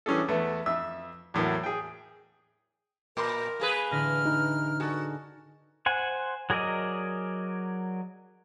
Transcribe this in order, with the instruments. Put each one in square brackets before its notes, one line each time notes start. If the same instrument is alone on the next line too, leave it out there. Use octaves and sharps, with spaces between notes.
[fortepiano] E3 G3 C#4 D4 G#4 A4
E2 A3 B3 E5
F2 E5 E6
E2 A2 F#3 A#3
G#4 G5
[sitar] A#2 [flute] A#4 [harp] B5 C6 D6
[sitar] A#3 G#4 B4
[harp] A1 D3 A#6 [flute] F6
[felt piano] D#4
[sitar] F#4 [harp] G#4 A4 D5
[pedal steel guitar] C5 F#5 G#5
F#3 G#4 A#4 D5 D#5